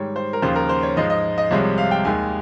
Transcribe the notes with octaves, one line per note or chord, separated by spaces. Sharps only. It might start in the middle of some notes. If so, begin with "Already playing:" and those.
Already playing: G#2 D#3 G3 C#5
C5
A#4
D#2 C#3 F3 C5
A#4
C5
C#5
G#2 F3 G#3 D#5
D#5
D#5
C2 C3 F3 G#3 C#5
F5
G5
D#2 D#3 G#3 G#5